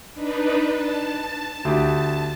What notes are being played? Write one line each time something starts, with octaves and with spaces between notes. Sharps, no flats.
D4 D#4 B4
A5
D2 G4 A5